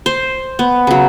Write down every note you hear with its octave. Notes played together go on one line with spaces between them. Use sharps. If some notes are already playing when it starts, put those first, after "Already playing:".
C5
B3
C#3 F#3